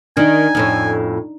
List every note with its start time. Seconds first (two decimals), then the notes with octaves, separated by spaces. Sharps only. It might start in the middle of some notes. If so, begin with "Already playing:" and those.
0.17 D#3 D4 D#4 G#5
0.55 F2 A2 C#4